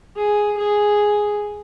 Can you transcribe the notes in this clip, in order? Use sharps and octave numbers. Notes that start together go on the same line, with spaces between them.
G#4
G#4